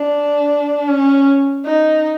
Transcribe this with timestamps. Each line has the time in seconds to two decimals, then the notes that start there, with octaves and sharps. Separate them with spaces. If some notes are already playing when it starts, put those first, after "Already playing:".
Already playing: D4
0.88 C#4
1.65 D#4